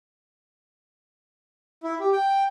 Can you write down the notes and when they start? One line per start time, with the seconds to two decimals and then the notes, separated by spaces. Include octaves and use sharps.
1.84 E4
2.00 G4
2.13 G5